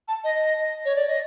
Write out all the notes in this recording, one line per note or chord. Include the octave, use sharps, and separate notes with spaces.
A5
D#5
C#5
D5
D#5